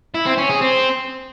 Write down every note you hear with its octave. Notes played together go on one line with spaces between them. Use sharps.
E4
C4
C#4
G#4
C4